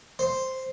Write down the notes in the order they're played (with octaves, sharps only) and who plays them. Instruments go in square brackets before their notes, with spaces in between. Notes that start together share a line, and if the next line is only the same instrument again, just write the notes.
[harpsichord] C5